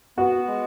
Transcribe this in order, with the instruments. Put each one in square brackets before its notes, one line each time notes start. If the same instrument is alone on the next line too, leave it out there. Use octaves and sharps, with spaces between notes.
[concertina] B3 [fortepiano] F#4
[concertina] G#3